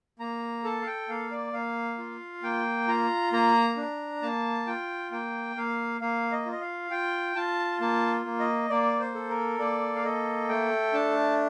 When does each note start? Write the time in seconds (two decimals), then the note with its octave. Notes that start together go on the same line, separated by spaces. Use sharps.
0.19 A#3 A#5
0.64 A4 A5
0.82 F5
0.87 G5
1.09 A#3 F5
1.31 D5
1.53 A#3 F5
1.98 F4
2.43 A#3 G5
2.88 F4 A#5
3.33 A#3 A#5
3.77 D4
4.22 A#3 A5
4.67 F4 G5
5.11 A#3 G5
5.56 A#3 F5
6.01 A#3 F5
6.32 D#5
6.46 F4
6.52 D#5
6.61 F5
6.91 F4 G5
7.36 F4 A5
7.81 A#3 A5
8.25 A#3
8.39 D#5
8.70 A#3 D5
9.00 C5
9.15 A4
9.30 A#4
9.59 A#3 D5
9.95 F5
10.04 A4 D#5
10.49 A3 G5
10.93 D4 A5